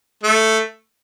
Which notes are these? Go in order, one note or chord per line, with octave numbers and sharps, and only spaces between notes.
A3